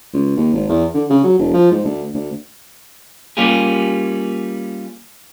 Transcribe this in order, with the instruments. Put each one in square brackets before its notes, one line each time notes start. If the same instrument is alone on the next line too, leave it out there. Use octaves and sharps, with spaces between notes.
[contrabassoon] C#2
D#2
G#1
E2
D3
C#3
F#3
E1
F3
G#2
D2
D2
[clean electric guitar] G3 A#3 C#4 F4 G4 G#4